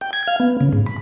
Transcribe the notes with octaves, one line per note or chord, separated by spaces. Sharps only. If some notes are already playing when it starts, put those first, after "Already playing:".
G5
G#6
F5
B3
C#3
G#2
B5